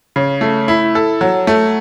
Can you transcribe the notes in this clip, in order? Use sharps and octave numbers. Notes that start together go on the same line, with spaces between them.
C#3
A3
E4
A4
F#3
A3